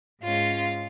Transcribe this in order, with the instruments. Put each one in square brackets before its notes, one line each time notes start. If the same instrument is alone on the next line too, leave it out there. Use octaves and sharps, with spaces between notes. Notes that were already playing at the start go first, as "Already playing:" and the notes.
[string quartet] G#2 G#3 C#4 F4